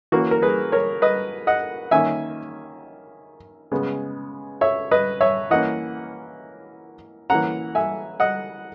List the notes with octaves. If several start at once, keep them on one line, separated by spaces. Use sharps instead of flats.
E3 A#3 C#4 F#4 A#4
A#4
G#4 B4
A#4 C#5
B4 D#5
D#5 F#5
D#3 A#3 C#4 E5 G#5
C#3 G#3 B3
C#5 E5
B4 D#5
C#5 E5
E3 A#3 C#4 D#5 F#5
E3 A#3 C#4 F#5 A#5
E5 G#5
D#5 F#5